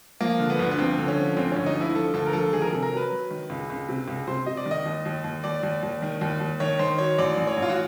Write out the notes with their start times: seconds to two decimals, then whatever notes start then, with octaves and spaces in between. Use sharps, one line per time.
0.21 F3 A#3
0.40 D3
0.50 B3
0.59 D2
0.71 B3
0.79 F3 C4
0.98 D3
1.08 C#4
1.17 F3
1.37 D2 C4
1.52 D2 C#4
1.66 D#4
1.76 F3
1.81 E4
1.95 F3 A4
2.14 D2 A4
2.26 A#4
2.33 F3 A4
2.53 D#3 G#4
2.62 A#4
2.68 A4
2.73 C3
2.82 A#4
2.92 F#3 B4
3.12 F#3
3.31 D#3
3.50 C#2
3.70 C#2
3.89 C3
4.08 C#2
4.27 C3 C5
4.46 C3 D#5
4.57 D5
4.66 D#3
4.71 D#5
4.85 D#2
5.05 D#2
5.24 D#2
5.44 D#2 D5
5.63 D#2
5.83 D#2
6.02 D#3
6.21 D#2
6.40 D#2
6.60 D#3 C#5
6.79 D#3 C5
6.98 F#3 C#5
7.18 A1 D5
7.38 A1
7.47 C#5
7.57 A1
7.62 F4
7.70 F#4